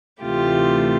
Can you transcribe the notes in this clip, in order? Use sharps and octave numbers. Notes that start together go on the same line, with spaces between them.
D2 C3 E3 A3 F4 G4